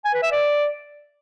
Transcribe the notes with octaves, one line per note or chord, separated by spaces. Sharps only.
G#5
B4
E5
D5